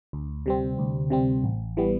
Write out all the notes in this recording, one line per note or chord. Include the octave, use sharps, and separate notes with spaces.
D2
C3 G3 C4
D2
C3 G3 C4
A1
E3 G3 B3